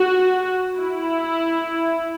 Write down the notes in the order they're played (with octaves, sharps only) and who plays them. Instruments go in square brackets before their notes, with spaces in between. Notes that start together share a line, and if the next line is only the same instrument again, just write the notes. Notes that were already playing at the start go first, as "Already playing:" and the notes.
Already playing: [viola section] F#4
E4